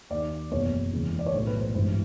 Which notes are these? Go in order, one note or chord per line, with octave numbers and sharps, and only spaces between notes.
D#2 D#3 D5
F#1 E2 B2 C#5
E1 E2 C#3 E3
D5
C#5
B1 A2 E3 C5
B4
C5
G#1 G2 E3 C5